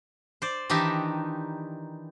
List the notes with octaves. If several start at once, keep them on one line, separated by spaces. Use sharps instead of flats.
C5 D5
D#3 E3 D4 D#4 G4 E5